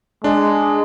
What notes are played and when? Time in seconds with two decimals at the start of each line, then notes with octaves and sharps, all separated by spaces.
0.24 G#3 D4